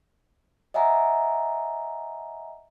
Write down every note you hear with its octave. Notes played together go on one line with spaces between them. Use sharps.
D#5 E5 F#5 G#5 A#5